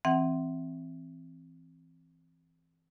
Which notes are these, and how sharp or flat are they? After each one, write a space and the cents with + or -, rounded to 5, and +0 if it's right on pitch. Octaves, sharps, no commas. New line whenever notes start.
E3 +0 C4 +0 F#5 +25